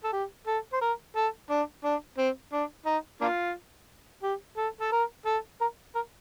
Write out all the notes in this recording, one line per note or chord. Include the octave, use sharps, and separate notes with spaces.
A4
G4
A4
C5
A#4
A4
D4
D4
C4
D4
D#4
A#3 D4 F4
G4
A4
A4
A#4
A4
A#4
A#4